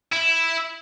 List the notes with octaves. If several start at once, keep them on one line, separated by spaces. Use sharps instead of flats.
E4